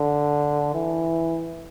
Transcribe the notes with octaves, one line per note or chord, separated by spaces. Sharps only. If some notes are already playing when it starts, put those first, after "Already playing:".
Already playing: D3
E3